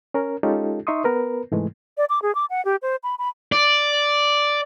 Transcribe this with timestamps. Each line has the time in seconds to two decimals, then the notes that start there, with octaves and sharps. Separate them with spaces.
0.14 C#4 A#4
0.43 G#3 C#4 D#4 F4 G4 A4
0.87 D#4 E5 C6 C#6 D#6
1.04 B3 A#4 B4
1.52 G#2 C3 E3 G#3 A3
1.97 D5
2.10 D6
2.22 G#4
2.35 D6
2.50 F#5
2.65 G4
2.82 C5
3.04 B5
3.19 B5
3.52 D5